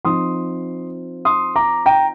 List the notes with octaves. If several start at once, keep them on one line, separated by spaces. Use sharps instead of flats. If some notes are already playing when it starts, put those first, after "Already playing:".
F3 C4 D#4 C6 D#6
C6 D#6
A#5 D6
G5 A#5